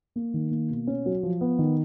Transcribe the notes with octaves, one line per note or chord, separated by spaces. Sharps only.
A#3
D#3
A#3
B2
C#4
F#3
F3
B3
D#3